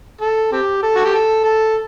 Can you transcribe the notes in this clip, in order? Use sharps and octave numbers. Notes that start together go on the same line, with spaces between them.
A4
C4 G4
A4
F#4
G4
A4
A4